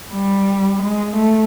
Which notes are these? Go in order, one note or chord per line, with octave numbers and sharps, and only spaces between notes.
G3
G#3
A3